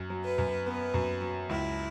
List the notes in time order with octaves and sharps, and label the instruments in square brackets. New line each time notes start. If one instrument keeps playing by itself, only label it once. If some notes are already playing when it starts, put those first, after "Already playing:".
Already playing: [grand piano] F#2
F#3
[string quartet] B4
[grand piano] F#2
[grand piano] B3 [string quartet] B4
[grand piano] F#2
F#3
[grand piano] C#2 [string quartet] E4